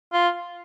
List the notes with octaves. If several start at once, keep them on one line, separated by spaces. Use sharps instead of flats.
F4